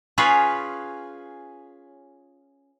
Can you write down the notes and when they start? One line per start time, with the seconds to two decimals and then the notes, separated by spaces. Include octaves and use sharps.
0.18 C#4 F4 G#4 B4 C#5